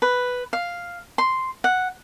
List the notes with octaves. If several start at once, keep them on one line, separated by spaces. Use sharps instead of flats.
B4
F5
C6
F#5